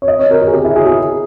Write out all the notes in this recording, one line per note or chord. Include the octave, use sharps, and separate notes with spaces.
C#5
D#5
C#5
A#4
A#4
G#4
G4
E4
G#4
G#4